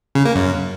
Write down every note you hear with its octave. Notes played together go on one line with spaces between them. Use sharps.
C#3
A#3
F#2